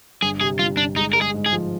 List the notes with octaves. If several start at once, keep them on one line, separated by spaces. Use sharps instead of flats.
G1 G#4
C3 G#4
G1 F4
G1 D4
G#3 D#4
G#3 A#4
G#4
G#2
G#4
F3